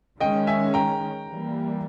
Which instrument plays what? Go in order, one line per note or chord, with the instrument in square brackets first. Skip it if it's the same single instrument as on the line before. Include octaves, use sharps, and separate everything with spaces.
[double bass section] D#3 G#3 C#4 [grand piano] D#5 G5
[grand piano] E5 G#5
G5 A#5
[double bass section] E3 G3 A#3